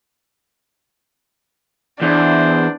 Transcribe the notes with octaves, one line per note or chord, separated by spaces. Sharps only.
E2 D4 C5